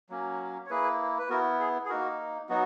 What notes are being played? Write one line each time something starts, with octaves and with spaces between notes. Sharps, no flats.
F#3 A#3 C#4
C#5
A#3 E4 G#4 B4
B4
B3 E4 F#4 A#4
G#4
G#4
A#3 D#4 F#4 A#4
F#3 B3 D#4 F#4